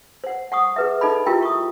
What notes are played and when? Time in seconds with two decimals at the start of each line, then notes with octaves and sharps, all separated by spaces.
0.24 C5 F#5
0.52 F#5 C#6 D#6
0.76 G#4 B4 E5
1.01 D#4 A4 D#5 B5
1.26 E4 F4 G4 A#4 E5 G5
1.43 C#6 D#6